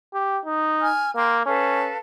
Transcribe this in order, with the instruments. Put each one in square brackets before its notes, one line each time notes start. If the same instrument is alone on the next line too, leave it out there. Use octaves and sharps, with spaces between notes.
[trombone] G4
D#4
[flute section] G#5 F6
[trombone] A#3 [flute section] G5 C6
[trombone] C#4 [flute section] A4 B4 F5